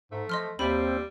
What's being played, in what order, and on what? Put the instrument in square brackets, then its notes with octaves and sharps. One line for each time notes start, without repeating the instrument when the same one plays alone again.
[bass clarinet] G#2 [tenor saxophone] A3
[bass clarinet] F3 [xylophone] D#5 C6 F6
[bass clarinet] D#2 [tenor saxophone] G3 [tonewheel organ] C4 [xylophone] E5 B5